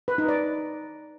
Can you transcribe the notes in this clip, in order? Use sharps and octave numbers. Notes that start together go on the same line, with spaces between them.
B4
D#4
D5